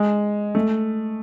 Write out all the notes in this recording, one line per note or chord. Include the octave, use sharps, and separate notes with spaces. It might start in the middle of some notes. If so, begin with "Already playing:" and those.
Already playing: G#3
A3